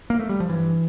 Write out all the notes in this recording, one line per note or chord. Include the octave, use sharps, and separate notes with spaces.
A#3
A3
G3
F3
G2 E3